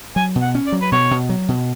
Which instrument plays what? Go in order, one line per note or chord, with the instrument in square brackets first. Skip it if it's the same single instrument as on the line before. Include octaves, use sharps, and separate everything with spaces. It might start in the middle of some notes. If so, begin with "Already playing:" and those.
[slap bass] F#3 [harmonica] G#5
[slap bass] B2
[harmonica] F#5
[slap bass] C#4
[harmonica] D5
[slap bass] F#3
[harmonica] B4
[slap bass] B2 [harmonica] C#5
[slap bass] B2
F#3
B2